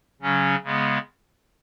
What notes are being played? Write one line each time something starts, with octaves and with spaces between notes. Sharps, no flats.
C#3 F#3 C#4
C#3 G#3 B3